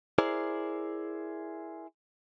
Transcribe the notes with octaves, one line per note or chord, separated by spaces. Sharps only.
E4 G#4 A#4 C5 D5